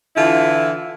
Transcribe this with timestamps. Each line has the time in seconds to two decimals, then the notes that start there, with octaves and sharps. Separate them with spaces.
0.16 D3 E3 E4 F4